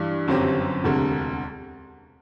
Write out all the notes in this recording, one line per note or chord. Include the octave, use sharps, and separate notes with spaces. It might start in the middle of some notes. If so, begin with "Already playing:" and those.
Already playing: G2 E3 G3 D4
G1 F#2 F#3 C4 G4
E1 D2 C3